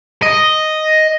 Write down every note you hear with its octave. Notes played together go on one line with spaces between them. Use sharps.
D#5